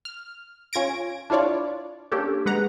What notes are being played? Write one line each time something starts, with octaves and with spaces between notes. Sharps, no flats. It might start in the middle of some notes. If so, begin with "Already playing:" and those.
F6
C#4 F4 G#6 A#6 D7
D4 E4 F4 C#5 D5
A#3 C#4 D4 G4 A4
G#3 B4 F#5 A#5